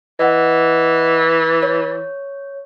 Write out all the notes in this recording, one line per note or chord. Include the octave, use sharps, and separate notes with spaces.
E3 D#5 F#5
C#5